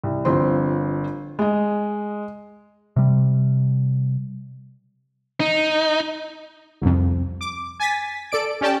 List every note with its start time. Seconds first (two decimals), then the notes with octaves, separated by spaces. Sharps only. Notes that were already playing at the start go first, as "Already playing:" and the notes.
0.04 C2
0.25 G1 F3 C4 C6
1.39 G#3 D#5
2.96 C3 G3
5.40 D#4
6.82 C2 F2
7.41 D6
7.80 G#5 A6 B6
8.32 A4 D5 D7
8.61 C#4 G4 D5 G5 A5